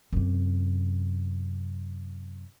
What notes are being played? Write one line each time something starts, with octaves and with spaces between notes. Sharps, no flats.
F#2 C3